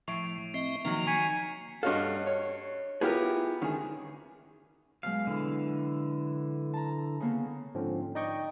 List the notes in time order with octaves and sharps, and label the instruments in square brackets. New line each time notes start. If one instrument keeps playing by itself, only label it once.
[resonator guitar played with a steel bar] A2 [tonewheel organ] F3 [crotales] C#6 D7
[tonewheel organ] C4 D#5 E5 [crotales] C7
[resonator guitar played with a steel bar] D#3 F#3 [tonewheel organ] F3 A#3
[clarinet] G#5 [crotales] C#6 B6 C#7
[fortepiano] G2 F#4 F5 [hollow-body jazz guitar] A4 C#5 D#5
[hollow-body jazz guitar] C#5
[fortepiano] B3 G4 A#4 [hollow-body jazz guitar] E4 F4 G#4
[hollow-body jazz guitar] D2 C#4 [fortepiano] D#3 G#4
[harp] B2 F#3 G#3 [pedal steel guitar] F5
[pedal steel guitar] D3 E3
[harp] A5 A#5
C#3 A#3 B3
[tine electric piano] G#2 D3 F3 C4 C#4
D#4 D5 D#5 G5 C#6